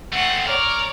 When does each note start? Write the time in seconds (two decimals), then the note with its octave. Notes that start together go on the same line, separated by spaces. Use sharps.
0.13 A3 C4 F#5
0.47 A#4 C#5 D5